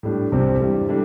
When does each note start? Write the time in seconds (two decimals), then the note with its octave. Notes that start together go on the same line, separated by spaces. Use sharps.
0.03 A2 G3 D4
0.32 C2 C3 G3 C4
0.60 G2 E3 G3
0.89 E3 G3 D4 A4